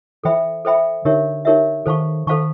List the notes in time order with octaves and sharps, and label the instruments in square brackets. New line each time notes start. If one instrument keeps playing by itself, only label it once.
[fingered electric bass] E3 [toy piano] A4 C5 E5 G5 B5
[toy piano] A4 C5 E5 G5 B5
[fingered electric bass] D3 [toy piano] D#4 G4 A#4 C#5 E5
[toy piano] D#4 G4 A#4 C#5 E5
[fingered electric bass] D#3 [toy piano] A4 C5 F5 A5 C#6
[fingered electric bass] D#3 [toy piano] A4 C5 F5 A5 C#6